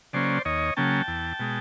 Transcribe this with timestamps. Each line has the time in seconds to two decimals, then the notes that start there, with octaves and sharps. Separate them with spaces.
0.13 C#3 F#3 A#3 C#4 C5 D5
0.45 D#2 C#5 D#5
0.77 C#3 F#3 A#3 C#4 G5 A5
1.08 E2
1.40 B2 G#3